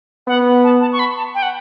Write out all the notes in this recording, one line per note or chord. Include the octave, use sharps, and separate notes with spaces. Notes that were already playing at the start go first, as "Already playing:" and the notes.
B3 F#5
A5
A5
C#6
B5
A5
G5
F#5